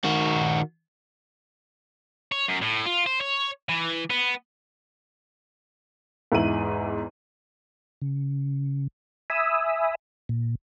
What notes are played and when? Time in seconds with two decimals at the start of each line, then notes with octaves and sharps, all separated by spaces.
0.04 D#3 F#4
2.32 C#5
2.48 F#2
2.62 A2
2.86 F4
3.06 C5
3.21 C#5
3.69 E3
4.10 B3
6.32 E2 G#2 E4 D#7 F#7
8.02 C#3
9.30 E5 G#5 B5 D#6 E6
10.29 A#2